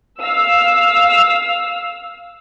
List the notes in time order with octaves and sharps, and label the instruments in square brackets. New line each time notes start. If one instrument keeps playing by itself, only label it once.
[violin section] F5 E6